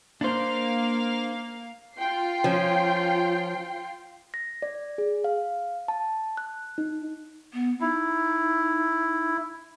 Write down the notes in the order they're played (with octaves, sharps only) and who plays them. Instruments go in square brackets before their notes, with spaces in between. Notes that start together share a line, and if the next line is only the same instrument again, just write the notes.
[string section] A#3 F5 [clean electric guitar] D4 C5
[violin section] F4 G5 C7
[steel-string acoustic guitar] F3 C#4
[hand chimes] A#6
D5
G#4
F5
A5
F#6
D#4
[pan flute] B3
[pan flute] D#4 [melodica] E4